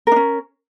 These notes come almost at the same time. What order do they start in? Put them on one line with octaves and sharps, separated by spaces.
A#4 D4 C#4